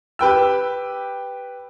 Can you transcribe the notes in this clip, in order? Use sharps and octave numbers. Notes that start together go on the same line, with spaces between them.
G4 B4 G5 E6